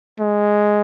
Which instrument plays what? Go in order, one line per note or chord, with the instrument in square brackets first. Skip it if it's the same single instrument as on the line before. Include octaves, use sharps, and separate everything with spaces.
[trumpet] G#3